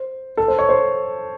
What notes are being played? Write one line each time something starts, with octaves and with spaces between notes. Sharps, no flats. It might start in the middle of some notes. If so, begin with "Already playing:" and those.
Already playing: C5
A4
C5
C#5
C5